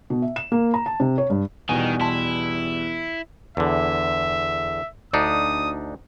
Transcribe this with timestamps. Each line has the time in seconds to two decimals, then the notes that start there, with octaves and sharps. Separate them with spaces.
0.10 B2
0.22 E5
0.36 E7
0.52 A#3
0.74 A#5
0.86 A5
1.00 C3
1.18 C#5
1.30 G2
1.69 E2 B2 D#3 G3 G#5
2.01 E4 A5 C6
3.57 E2 D3 E5
5.13 D2 D4 D#4 D#6